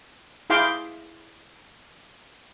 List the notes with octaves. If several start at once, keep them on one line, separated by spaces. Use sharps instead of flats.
E4 G#4 F5 G5 C6 D6